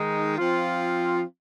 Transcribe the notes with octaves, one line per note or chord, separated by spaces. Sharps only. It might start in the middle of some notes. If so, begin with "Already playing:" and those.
Already playing: D#3 G#3 D#4
F3 C4 F4